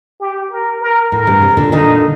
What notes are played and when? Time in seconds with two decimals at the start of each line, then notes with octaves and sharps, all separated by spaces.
0.21 G4
0.51 A#4
0.81 A#4
1.12 A2 A#4
1.27 G2
1.42 C3
1.57 A#2 D3
1.72 A#2 D3 D#4